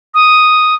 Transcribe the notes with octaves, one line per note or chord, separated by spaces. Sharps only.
D#6